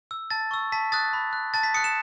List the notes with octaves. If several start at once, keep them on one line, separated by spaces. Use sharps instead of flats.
E6
A5 A6
C#6 E6
A5 B6
D#6 F#6 A6
B5
F#6
A5 A6
B6
D#6 F#6 C#7
E7